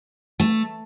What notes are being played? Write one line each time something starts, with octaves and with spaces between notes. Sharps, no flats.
A3